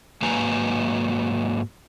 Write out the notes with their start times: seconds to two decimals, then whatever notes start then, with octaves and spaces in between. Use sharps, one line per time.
0.22 G#2 F#3 A#3 B4 G#5 A#5